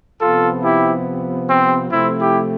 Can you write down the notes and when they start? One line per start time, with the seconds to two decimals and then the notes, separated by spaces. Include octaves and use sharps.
0.20 C3 F3 B3 F4 A4
0.63 E4 G4
1.48 C4
1.91 C3 F3 A3 C4 E4
2.20 E4 G4